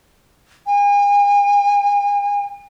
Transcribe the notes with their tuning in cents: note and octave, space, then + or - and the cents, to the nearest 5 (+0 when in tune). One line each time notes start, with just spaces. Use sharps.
G#5 -40